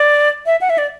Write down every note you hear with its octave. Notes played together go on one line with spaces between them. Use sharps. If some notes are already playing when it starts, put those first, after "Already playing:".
Already playing: D5
E5
F#5
E5
D5